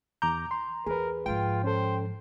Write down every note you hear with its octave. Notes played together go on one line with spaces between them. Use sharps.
E2 A#5 D6 G6
C6
E2 G#4 A#4 B4
G#2 F3 F4 G5
C#4 A4 C5